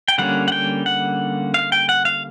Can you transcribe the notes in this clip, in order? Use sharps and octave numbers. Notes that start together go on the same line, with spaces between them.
G5
D3 G3 A#3 C#4 F#5
F#5
G5
F#5
F5
G5
F#5
F5